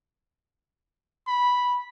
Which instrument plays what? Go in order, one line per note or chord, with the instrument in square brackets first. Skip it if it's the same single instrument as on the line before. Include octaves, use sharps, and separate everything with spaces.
[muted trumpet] B5